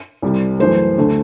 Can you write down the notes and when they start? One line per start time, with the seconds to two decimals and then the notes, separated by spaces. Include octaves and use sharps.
0.22 C2 C3 G3
0.59 F#2 E3 A3 C5
0.98 D2 D3 A3